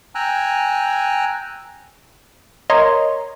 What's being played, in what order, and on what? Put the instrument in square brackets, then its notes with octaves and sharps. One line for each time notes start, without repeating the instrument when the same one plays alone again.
[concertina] G5 G#5 A#5 E6 F#6
[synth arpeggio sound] A#4 C#5 D#5 A#5 C6